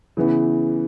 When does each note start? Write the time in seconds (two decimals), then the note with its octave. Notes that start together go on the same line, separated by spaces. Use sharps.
0.17 C#3 E3 B3 E4